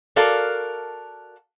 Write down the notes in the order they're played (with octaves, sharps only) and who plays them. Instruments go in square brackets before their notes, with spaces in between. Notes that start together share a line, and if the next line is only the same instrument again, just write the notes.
[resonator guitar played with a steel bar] F#4 A4 A#4 D5 F5